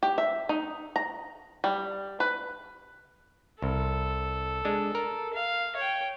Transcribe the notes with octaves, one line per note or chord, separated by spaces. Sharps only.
G4
E5
D#4
A#5
G3
B4
C2 A4
G#3 D4
A#4
F5
C#5 G5